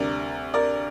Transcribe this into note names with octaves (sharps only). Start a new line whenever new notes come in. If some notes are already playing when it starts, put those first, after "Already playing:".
Already playing: D2 C3 G3 A#4 D5
A#4 D5